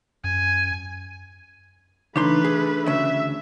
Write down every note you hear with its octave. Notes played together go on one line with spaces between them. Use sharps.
F#2 G#5
C#3 E3 A3 D4 D#4 B4 C6
G#4
D2 C#3 E5